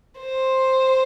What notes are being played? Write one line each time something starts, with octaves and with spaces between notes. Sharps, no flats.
C5